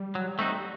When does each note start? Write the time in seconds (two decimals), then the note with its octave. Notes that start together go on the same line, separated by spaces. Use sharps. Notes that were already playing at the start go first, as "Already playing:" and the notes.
Already playing: G3
0.15 F#3
0.39 A3 C4 D#4 F#4